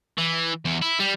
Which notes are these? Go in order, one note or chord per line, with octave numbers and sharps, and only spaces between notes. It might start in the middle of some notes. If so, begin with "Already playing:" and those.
E3
E2
E4
G3